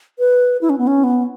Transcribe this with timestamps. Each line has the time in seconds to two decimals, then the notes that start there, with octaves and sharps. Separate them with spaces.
0.19 B4
0.61 E4
0.70 C#4
0.78 B3
0.87 C#4
1.04 B3